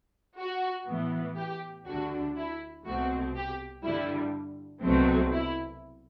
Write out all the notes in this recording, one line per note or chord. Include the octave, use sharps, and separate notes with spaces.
F#4
A2 E3 B3
G4
D2 D3 G3 D4 F#4
E4
C2 B2 A3 C4 F#4
G4
G2 D3 G3 E4
C2 B2 F#3 A3 C4
E4